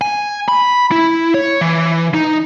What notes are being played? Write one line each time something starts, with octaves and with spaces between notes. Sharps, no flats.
G#5
B5
E4
C#5
E3
D#4